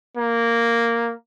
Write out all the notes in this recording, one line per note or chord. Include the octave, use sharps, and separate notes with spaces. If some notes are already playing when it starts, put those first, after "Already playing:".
A#3